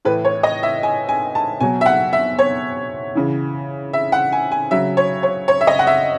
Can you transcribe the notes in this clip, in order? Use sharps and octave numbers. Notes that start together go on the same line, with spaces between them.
A2 E3 B4
C#5
D#5
E5
G#5
G#5
A5
B2 F#3 G#5
E5
F#5
E5
C#5
C#3 E3
E5
F#5
G#5
G#5
C#3 F#3 E5
C#5
C#5
C#5
E5
D#5
F#5
E5